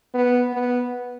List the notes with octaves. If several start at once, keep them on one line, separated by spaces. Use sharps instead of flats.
B3
B3